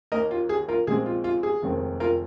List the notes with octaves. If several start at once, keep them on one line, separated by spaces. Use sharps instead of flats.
D#2 D#3 A#3 A#4 D#5
F4
G#4
F4 A#4
A#1 A#2 G#3 C4 G#4
F4
F4
G#4
F1 D#2 D#3 G#3 C4
F4 A#4